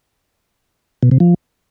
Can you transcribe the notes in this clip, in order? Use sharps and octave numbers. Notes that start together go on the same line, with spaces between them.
B2
C3
F3